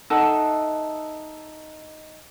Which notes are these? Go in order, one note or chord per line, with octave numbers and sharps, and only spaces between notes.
D#4 A4 E5 F#5